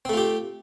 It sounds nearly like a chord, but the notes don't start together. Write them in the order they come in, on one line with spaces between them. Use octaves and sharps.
C4 A3 F4 G4